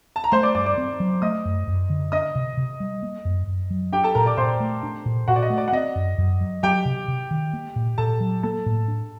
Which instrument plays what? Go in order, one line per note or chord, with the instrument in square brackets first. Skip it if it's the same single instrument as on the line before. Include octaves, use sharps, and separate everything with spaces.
[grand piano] A5
A#5
[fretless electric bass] A3 [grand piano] C5 C6
[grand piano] D5 D6
[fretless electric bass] G2 [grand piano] D5 D6
[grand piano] D5 D6
[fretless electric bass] C4
F#3
[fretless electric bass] A3 [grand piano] D#5 D#6
[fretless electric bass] F#2
F#2
D3
[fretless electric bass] D4 [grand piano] D#5 D#6
[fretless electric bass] C3
C3
G3
A#3
F#2
F#2
F#3
[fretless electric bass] D4 [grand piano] G4 G5
[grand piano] A4 A5
[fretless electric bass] A#2 [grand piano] A#4 A#5
[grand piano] D5 D6
[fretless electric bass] A#2 [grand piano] C5 C6
[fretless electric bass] A3
D4
A#2
[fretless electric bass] A#2 [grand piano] F#4 F#5
[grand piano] D5
D#5
[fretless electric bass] A3
[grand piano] D5
F#5
[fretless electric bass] C4 [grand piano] D#5
[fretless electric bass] F#2
F#2
F#3
[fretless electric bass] F#3 [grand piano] G4 G5
[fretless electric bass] C3
C3
D#3
A#3
A#2
[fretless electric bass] A#2 [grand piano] A4 A5
[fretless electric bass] F#3
[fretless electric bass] A#3 [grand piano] A4 A5
[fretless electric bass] A2
D4